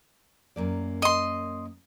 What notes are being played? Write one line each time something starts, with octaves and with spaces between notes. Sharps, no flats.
F#2 A#3 D5
D#5 C6